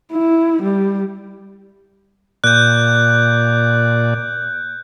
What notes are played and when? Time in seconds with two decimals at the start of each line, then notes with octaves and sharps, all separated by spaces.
0.13 E4
0.63 G3
2.44 A#2 D5 F#6 G6